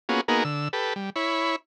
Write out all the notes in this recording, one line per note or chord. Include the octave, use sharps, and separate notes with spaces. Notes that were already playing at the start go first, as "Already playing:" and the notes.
A#3 B3 C#4 F4 F#4 G#4
A#3 B3 D#4 F#4 G#4 A#4
D3 E6
G4 A4 B4
G3
E4 C#5 B5